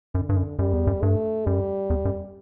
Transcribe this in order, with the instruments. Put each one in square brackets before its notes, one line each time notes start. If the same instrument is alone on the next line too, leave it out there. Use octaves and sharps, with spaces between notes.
[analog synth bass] F#2 [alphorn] D3
[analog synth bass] G2
F#2
[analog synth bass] F#2 [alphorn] G3
[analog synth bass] E2
F#2
[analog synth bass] G2 [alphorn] A3
[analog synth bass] F#2 [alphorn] G3
[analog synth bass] E2
F#2